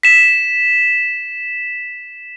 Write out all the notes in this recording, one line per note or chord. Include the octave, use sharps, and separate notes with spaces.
B6 E7